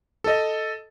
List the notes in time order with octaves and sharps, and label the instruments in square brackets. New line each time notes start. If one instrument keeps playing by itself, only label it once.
[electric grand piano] A4 D#5